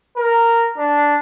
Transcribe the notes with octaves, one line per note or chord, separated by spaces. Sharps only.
A#4
D4